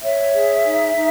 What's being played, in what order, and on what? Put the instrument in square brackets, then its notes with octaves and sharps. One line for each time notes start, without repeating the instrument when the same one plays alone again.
[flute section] C#5 E5
G#4
D#4
D#4